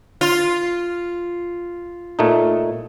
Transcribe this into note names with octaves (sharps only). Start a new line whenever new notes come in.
F4
A#2 A3 D#4